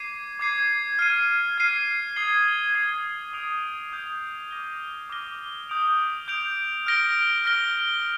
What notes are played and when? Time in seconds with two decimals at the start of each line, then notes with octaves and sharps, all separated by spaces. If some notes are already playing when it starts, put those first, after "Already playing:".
Already playing: D6 G#6 C7 D#7
0.39 D6 G#6 C7 D#7
0.99 F6 G#6 C7 D#7
1.58 F6 G#6 C7 D#7
2.16 D#6 G#6 C7 G7
2.75 D#6 G#6 C7 G7
3.33 D#6 G6 D7 F7
3.93 D#6 G6 D7 F7
4.51 D6 F6 A#6 D#7 G7
5.10 D6 F6 A#6 D#7 G7
5.69 D#6 G6 D7 F7
6.28 D#6 G6 D7 F7
6.87 F6 A#6 D7 G7
7.45 F6 A#6 D7 G7